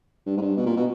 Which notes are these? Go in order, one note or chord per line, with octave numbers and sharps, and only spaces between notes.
G2
G#2
G2
B2
A#2
B2